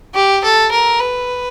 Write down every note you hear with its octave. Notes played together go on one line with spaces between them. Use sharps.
G4
A4
A#4
B4